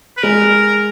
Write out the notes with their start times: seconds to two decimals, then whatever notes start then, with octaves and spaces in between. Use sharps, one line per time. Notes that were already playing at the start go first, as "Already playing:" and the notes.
0.17 B4
0.23 G#3 A#4